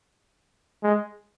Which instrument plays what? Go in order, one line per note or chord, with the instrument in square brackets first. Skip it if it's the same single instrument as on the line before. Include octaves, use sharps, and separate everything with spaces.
[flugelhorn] G#3